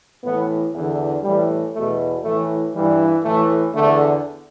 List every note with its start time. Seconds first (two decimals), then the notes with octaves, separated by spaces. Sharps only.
0.23 A2 E3 B3
0.73 E2 D3 E3
1.23 A2 E3 G3
1.74 E2 B2 A3
2.23 A2 E3 A3
2.74 G2 E3 G3
3.24 A2 E3 A3
3.74 E2 D3 A3